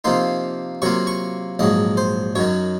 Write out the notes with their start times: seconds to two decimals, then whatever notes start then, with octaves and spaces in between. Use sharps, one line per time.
0.04 C3 F3 A#3 D#4 C6
0.82 C3 F#3 A#3 F4 C#6
1.07 C#6
1.59 A#1 G#2 F#3 D#5
1.97 C5
2.35 F#2 D#3 F#3 C#5